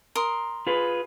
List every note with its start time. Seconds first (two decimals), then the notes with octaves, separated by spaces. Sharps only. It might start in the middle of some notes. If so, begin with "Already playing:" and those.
0.15 A#4 C6 D#6
0.67 F4 G#4 B4